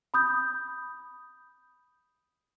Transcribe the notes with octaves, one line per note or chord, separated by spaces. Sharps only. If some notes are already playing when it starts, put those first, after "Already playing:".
B5 D#6 G6